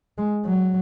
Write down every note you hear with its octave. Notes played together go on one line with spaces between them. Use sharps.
G#3
F#3